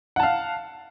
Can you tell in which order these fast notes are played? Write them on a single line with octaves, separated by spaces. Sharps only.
F#5 A5 F5